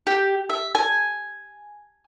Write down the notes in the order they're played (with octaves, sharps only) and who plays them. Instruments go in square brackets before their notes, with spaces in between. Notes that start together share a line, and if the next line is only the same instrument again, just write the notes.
[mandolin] G4
E5
G#5